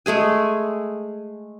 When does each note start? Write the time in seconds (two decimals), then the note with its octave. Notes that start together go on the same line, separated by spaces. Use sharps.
0.06 G#3 A3 G#4 G#5